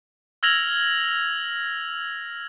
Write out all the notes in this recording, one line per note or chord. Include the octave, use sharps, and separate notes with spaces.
E6 F6 G#6 A#6 F7 F#7